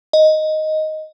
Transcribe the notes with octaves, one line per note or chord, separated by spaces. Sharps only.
D#5